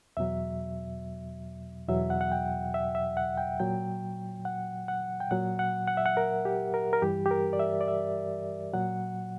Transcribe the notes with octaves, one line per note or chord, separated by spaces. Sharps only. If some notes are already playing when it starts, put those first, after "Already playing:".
E2 B2 F#3 E5
E2 B2 F#3 E5
F#5
F#5
G5
E5
E5
F#5
G5
A#2 F#3 G5
F#5
F#5
G5
A#2 F#3 F#5
F#5
F#5
E5
F#5
A#4
G4
A#4
A#4
G2 E3 G3 G4
G4
A#4
D5
E5
D5
E5
A#2 F#3 F#5